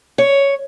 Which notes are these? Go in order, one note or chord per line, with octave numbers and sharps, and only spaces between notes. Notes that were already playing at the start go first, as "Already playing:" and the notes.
C#5